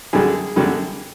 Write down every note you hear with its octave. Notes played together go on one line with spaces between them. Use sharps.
F#2 D3 G3 G#4
F#2 D3 G3